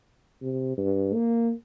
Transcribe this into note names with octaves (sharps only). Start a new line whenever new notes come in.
C3
G2
A#3